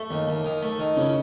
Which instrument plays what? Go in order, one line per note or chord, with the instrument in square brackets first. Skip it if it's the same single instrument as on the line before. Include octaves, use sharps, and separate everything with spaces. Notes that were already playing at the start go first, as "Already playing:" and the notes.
Already playing: [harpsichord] A3
D#2
D#2
D#3
A3
D#3
[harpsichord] C#3 [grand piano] C#4